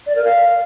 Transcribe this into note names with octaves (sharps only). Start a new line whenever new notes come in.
D5
A#4
F5